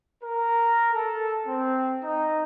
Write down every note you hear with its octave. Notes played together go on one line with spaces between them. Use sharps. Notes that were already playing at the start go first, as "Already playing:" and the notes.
A#4
A4
C4
D#4